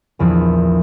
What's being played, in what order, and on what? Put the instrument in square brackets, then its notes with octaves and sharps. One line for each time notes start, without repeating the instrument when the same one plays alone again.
[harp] A#1 E2 E3 F3